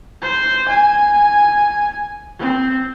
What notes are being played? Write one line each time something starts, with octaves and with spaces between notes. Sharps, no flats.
C5
G#5
C4